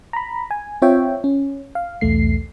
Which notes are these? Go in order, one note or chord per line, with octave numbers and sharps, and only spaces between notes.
A#5 B5
G#5
C4 F4 C#5 E5 G5
C#4
F5
B1 E2 A3 C7